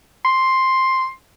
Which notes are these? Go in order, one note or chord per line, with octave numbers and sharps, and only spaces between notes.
C6